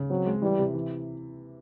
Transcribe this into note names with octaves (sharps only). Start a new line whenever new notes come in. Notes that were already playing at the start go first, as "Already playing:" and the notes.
Already playing: C#3
F#3 C4
G#3
E3 G3
C3
E3